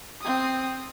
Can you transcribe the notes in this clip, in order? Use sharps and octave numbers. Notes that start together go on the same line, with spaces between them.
C4 D#6